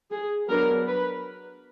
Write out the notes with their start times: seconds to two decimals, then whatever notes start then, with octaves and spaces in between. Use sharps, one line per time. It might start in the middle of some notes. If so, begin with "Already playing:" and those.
0.11 G#4
0.49 F#3 B3 D4 A#4
0.88 B4